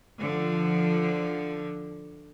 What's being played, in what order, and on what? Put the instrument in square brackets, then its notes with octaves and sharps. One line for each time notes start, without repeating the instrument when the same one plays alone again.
[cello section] D3 F3